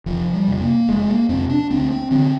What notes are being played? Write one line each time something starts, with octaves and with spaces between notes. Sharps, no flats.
F1 F3
G3
F2 C3
A#3
F1 G#3
A#3
F2 C3 C4
D4
D2 C4
C4
D3 C4